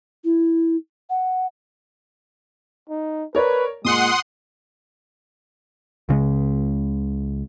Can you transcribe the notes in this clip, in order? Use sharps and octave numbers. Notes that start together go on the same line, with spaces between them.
E4
F#5
D#4
A#4 B4 C#5 D5
A#2 G#3 F#5 C6 D#6
C#2 C#3 G#3